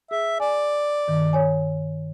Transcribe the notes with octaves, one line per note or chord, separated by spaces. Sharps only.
G#4 E5
D5 G#5
G2 D#3
C#5 G#5